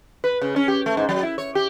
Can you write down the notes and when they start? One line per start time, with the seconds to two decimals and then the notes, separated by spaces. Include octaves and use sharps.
0.24 B4
0.42 C#3
0.56 C#4
0.68 G4
0.86 A3
0.97 G#2
1.09 F#3
1.23 E4
1.38 C#5
1.55 G4